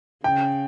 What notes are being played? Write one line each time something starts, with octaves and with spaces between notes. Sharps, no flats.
C#3 G5